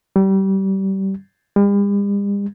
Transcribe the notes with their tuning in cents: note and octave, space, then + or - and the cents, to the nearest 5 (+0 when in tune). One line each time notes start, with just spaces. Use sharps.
G3 -25
G3 +45